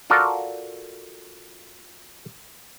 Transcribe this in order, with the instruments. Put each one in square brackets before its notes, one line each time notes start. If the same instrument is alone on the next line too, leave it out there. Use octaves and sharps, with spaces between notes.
[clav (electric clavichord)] F4 F#4 A4 A#4 D5